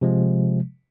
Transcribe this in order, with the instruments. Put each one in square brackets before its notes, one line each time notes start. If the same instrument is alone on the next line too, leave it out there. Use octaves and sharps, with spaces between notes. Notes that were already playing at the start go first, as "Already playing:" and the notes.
[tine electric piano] C3 F3 G#3